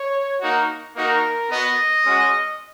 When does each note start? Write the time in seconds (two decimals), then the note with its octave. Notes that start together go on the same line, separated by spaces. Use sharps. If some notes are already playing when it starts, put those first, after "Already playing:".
Already playing: C#5
0.41 A#3 D#4 F#4
0.96 A#3 D#4 F#4 A#4
1.51 B3 F#4 D#5
2.05 G#3 C#4 F#4